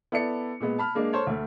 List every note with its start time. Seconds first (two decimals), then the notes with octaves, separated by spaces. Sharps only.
0.12 B3 E4 A4 D5 C#7
0.60 A#2 G#3 B3
0.78 A5 B5 F6
0.95 G#3 A#3 D4
1.13 A4 C5 C#5
1.27 D2 A3